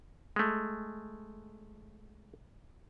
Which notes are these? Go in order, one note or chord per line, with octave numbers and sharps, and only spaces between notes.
G#3 A3